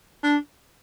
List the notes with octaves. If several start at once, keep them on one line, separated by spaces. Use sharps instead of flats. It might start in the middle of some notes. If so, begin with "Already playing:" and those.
D4